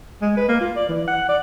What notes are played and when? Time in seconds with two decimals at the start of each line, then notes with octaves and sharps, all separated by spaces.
0.22 G#3
0.37 B4
0.49 A#3
0.61 F4
0.76 D5
0.89 E3
1.08 F#5
1.29 D5